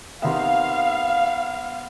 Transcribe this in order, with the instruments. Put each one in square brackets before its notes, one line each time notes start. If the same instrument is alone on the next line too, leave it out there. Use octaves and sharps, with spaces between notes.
[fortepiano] C3 D#3 E5 [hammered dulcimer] B3 C5 B5 [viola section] F5